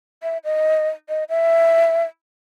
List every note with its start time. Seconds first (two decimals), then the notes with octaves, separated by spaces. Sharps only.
0.23 E5
0.44 D#5
1.09 D#5
1.29 E5